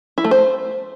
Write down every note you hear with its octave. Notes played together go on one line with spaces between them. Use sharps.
E4
A3
C5